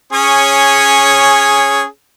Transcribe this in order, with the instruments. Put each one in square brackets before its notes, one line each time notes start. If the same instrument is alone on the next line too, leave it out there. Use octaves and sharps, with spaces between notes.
[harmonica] C#4 G#4 C#5